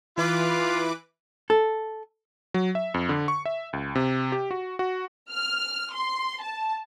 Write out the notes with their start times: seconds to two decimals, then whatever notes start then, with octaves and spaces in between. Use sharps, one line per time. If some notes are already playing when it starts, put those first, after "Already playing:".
0.18 E3 F4 B4 D6
1.50 A4
2.54 F#3
2.75 E5
2.94 F2
3.09 D3
3.28 C#6
3.45 E5
3.73 C#2
3.95 C3
4.32 G4
4.51 F#4
4.79 F#4
5.32 F6
5.94 C6
6.42 A5